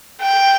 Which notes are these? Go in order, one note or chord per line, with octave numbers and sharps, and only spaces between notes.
G5